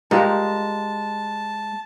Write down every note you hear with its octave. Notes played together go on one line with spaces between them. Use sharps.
G#3 F4 G4 A#4 A5